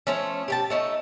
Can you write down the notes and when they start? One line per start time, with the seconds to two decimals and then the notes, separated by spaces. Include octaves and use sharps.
0.07 F3 A3 C#4
0.48 G4 G5 A5
0.70 A3 C#4 D#4